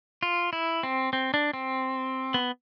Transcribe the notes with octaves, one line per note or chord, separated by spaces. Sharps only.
F4
E4
C4
C4
D4
C4
B3